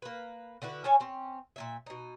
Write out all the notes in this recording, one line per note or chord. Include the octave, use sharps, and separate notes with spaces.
A#3 B4
D3 E4 F#4 B4
C#4 A4 C#5 G#5
C4 C#4
A#2 C#3 E5
B2 D#4